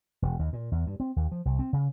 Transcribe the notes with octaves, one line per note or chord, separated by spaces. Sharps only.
E1
D#2
A#2
E2
G2
C4
D#2
F3
C2
C4
C#3